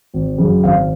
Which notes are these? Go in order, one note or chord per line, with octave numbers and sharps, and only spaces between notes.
G#1
F#2 C#3
G#1 F5